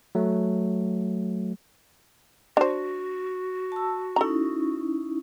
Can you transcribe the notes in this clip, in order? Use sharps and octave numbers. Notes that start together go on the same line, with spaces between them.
F#3 A3
D4 F#4 C5
A5 E6
C#4 D#4 E4 A4 A#5